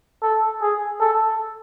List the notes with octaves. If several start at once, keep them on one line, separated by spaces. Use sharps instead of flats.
A4
G#4
A4